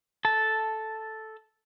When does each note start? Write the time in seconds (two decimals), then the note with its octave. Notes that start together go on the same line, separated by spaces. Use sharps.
0.25 A4 A5